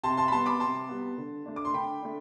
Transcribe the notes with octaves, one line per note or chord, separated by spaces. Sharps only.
C3 A5 C6
A5 C6
B5
G3 B3 A5 C6
B5 D6
C3 A5 C6
G3 B3
D3
A3 D4
D6
C6
D3 G5 B5
A3 D4